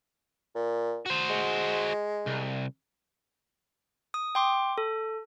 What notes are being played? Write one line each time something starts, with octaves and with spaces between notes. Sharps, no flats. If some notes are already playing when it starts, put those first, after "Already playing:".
A#2
F#4 C5
G#3
C2
D#6
G5 C6 D6
A4